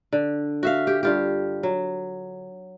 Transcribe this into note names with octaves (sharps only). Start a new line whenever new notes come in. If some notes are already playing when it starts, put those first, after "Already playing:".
D3
F#4 E5 F5
G4
G2 F4 G4
F#3